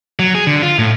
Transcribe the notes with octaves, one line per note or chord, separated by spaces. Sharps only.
F#3
G#4
D3
F4
A2